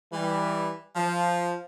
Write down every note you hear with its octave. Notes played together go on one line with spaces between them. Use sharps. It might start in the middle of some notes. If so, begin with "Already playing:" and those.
E3 G3
F3